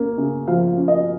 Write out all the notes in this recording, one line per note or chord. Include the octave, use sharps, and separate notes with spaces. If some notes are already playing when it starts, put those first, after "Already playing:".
Already playing: A#3 C#4
C#3
F3 F5
F5
C#4
D#5